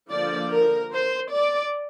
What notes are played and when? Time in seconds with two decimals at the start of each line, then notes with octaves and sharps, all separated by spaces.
0.10 D3 F3 A#3 D5
0.51 A#4
0.92 C5
1.32 D5